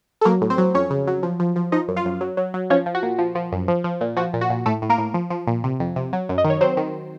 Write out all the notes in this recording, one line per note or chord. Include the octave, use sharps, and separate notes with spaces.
A4
F#3 A#3 A#4
A2
C4 C5
F#3
F2 C#4 C#5
C#3
F#3
F3
F3
F3
F3 D#4 D#5
F#2
F4 F5
F#2
F#3
F#3
F#3
F3 C#4 C#5
F3
F#4
A#2
F3
F3
F#2
F3
F3
A#2
F3 F#4
A#2
F#4
A#2
A2 A3 A4
A2
A#3 A#4
A2
F3
F3
A#2
C3
F2
C3
F#3
F#2
D#5
D#3
C#5
F#3 C4 C5
D#3